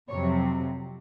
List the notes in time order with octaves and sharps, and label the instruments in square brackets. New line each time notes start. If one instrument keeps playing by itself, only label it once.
[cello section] F2 C3 F#3 C#5